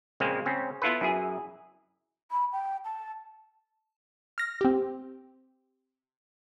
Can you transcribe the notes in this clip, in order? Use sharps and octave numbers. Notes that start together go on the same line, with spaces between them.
A#2 C#3 F3 G#3 A#3 C4
C#3 C4 C#4
B3 E4 F4 A4 B4
F#2 E4 G#4
B5
G5
A5
F6 A#6
C4 G4